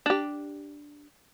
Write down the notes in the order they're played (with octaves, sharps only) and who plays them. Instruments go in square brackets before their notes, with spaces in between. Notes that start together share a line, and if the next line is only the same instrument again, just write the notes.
[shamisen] D4 G4